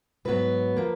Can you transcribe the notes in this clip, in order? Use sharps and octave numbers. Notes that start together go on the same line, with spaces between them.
G#2 F#3 B3 B4
F3 A#3